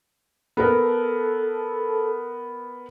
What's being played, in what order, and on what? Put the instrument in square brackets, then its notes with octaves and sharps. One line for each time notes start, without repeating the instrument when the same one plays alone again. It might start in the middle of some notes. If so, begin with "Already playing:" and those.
[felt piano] B3 A#4 [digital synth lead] A4